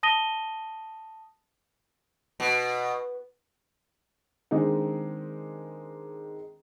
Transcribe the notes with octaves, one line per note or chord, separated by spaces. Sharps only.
A5 D#6 A#6 D#7 G7
B2
D#3 G#3 C4 D4 D#4